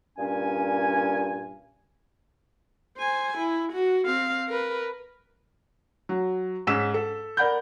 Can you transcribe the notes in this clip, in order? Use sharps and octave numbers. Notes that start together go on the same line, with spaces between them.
G2 A#2 C#4 G#5
C5 G#5
E4
F#4
C4 F5
A#4 B4
F#3
G#2 C#4 E6 B6 E7
A4
A#4 D5 F#5 B5 G6